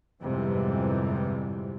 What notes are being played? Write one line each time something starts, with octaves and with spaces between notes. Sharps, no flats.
G1 F2 G#2 C3 E3 G3